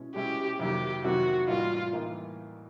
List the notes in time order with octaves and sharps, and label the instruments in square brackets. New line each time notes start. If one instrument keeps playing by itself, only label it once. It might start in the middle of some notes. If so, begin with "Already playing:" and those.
Already playing: [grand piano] B2 G#3 C#4 E4
[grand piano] B2 G#3 C#4 E4 [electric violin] G4
[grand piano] F2 C3 D#3 F#3 A#3 [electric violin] G4
[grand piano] F2 C3 D#3 F#3 A#3 [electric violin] F#4
[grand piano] A2 E3 G3 A#3 D#4 [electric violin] F4
[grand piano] A2 E3 G3 A#3 D#4